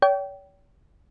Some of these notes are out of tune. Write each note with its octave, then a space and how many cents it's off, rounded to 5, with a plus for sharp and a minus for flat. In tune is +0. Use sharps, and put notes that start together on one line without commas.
C#5 +40 G5 -20